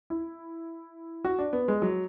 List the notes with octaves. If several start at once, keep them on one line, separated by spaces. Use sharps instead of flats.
E4
F#4
D4
B3
G#3
F#3